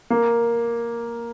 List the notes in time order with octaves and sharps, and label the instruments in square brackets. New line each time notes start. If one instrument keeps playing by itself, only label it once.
[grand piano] A#3